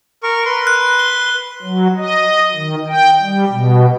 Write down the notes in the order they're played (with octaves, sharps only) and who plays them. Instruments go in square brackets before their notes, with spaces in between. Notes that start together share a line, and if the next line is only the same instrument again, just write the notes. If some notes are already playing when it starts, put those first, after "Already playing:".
[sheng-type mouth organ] A#4 C#6
B4 C6
[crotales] F#6
G7
[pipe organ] F#3
D#5
D#3
G5
G3
B2